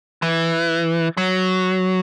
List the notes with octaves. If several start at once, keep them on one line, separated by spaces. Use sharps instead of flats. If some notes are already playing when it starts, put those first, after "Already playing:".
E3
F#3